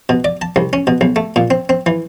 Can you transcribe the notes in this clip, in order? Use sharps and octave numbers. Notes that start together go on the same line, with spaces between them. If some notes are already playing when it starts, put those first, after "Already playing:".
B2
D5
A5
C2
C#4
B2
B1
A3
A#2
C4
C4
E3